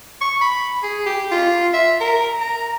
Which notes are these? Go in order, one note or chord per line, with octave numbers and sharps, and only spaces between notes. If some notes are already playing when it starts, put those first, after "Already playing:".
C#6
B5
G#4
G4
F4
E5
A#4
A#5